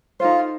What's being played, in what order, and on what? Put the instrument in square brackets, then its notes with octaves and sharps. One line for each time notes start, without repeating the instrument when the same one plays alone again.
[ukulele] D#4 A4 C5 [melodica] F4